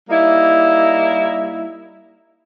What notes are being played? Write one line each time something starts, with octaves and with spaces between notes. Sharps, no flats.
G3 A#3 D#4 E4